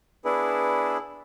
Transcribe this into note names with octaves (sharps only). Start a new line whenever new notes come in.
B3 D4 E4 G#4 B4